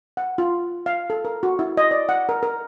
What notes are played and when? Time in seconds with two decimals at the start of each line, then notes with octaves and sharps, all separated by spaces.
0.17 F#5
0.38 F4
0.86 F5
1.10 A4
1.25 A#4
1.43 F#4
1.59 E4
1.77 D#5
1.91 D5
2.09 F#5
2.29 A#4
2.43 A#4